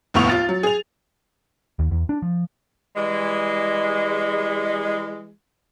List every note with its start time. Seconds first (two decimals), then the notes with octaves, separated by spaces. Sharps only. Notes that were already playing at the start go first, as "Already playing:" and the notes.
0.14 F1 D#2 A2 B3 C#6 F7
0.30 F4 A6
0.49 F#3
0.63 G#4 F7
1.79 D#2
1.91 E2
2.09 D4
2.22 F3
2.96 E3 G3 G#3